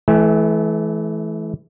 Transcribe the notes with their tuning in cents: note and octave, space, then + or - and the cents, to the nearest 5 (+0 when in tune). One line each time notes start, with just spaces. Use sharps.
E3 +0 A3 -35 G#5 -25